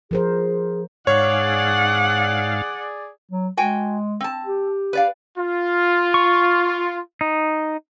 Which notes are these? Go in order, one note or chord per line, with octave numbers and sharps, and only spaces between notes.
F3 G#4 A#4 C5
G#2 G#4 C#5 D5 F5 F#5
F#3
G#3 F#4 G5 G#5
C4 A5
G4
B4 D5 F5
F4
C#6
D#4